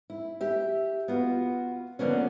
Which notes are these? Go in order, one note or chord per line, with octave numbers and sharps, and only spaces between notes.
E4
G4 E5
B3 F4 F#4
D3 F3 A#3 B3 C#4